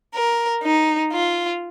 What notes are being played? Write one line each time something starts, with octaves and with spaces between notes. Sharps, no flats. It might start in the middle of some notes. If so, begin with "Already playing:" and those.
A#4
D#4
F4